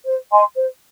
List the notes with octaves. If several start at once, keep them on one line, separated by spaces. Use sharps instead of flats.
C5
D#5 G#5 C6
C5